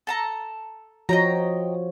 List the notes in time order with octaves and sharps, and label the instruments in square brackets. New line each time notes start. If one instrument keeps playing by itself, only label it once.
[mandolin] A4 A5 A#5
[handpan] F3 F#4 C#5 [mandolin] D#5 G5 A#5